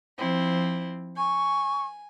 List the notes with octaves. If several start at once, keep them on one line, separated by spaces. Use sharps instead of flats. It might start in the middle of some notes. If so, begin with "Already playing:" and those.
F3 C4 E4
G#5 C#6